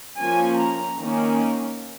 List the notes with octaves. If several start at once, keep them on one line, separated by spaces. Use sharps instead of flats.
F3 A#3 C#4 G#5
A#5
D#3 A#3 C#4